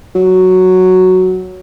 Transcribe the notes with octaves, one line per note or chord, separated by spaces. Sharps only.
F#3